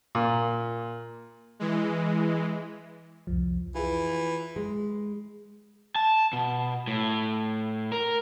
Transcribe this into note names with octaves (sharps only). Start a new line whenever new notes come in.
A#2
E3 G#3
C2 F2 F3
E3 F4 G#4
G#3
A5
B2
A2
A#4